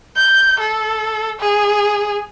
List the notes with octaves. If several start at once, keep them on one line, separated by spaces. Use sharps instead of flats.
G6
A4
G#4